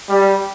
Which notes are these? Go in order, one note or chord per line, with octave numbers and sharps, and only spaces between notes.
G3